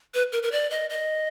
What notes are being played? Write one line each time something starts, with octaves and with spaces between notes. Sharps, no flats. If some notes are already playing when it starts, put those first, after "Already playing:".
B4
A#4
A#4
D5
D#5
D#5